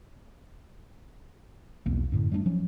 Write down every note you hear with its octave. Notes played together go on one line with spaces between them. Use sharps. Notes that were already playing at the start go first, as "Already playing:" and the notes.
B1 E2 A#3 C4
F#2 A2 D3
G3 A3 C4 D4
F3 F#3 C#4